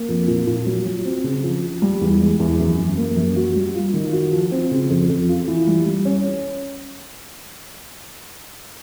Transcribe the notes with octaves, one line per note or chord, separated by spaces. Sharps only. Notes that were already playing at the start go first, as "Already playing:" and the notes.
Already playing: A#3
F2
A#2
A#2
F#3
F#3
C4
C#3
F3
F3
G3
E2
G#3
E2
F#2
F#2
A#3
F#2
F#4
G3
F4
D#3
F#4
F3
C4
C#3
F2
F2
F4
E3
G3
G3
C#4